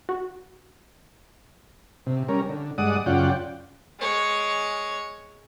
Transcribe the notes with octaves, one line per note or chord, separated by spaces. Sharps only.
F#4
C3
G3 C#4 A#4
D3
G2 G#3 D5 F#5 D#6
F#2 C#3 F4 D5 F#5 G5
G#3 C#5